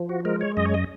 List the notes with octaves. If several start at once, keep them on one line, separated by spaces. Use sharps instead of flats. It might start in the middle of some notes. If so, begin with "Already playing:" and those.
Already playing: F3
F#4
G#3 A#4
C#5
F#2 D#5
C#5
D#5